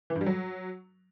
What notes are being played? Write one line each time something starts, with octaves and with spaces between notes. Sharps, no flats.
E3
G2
G3
F#3